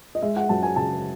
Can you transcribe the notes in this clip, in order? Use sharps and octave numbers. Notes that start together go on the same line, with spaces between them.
D#5
G#3 E5
F#5
F#2 A5
G#5
C#3 A5